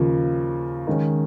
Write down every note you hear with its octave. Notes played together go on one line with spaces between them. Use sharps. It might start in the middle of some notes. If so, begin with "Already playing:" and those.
Already playing: D#2 C#3 F3
D#3 G#3 C#4